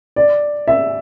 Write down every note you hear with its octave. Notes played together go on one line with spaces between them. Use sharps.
D5
E5